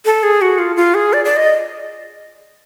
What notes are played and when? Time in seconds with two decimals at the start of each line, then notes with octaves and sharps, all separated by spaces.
0.05 A4
0.23 G#4
0.41 F#4
0.59 F4
0.76 F4
0.94 G#4
1.13 D5
1.25 D5
1.36 D#5